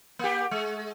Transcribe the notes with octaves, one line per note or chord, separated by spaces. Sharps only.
A#3 G4
G#3